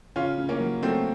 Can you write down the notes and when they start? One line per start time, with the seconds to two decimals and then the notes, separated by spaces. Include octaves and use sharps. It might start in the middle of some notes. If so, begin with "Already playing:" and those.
0.16 C#3 C#4 F4
0.38 C#3
0.49 A#3 C#4
0.60 F#3
0.83 F#3 A3 C4